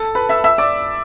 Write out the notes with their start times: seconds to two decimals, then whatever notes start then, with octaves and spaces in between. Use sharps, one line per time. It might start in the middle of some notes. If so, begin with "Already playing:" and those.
Already playing: A4 A5
0.15 B4 B5
0.29 E5 E6
0.44 E5 E6
0.58 D5 D6